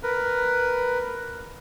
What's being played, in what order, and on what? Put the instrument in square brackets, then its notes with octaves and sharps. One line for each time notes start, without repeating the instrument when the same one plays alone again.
[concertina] A#4 B4